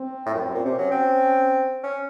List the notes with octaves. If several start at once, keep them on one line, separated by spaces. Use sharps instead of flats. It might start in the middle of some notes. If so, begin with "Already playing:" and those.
Already playing: C4
A2
F#2
F#2
A#2
C3 C#4
F#3
C4
C#4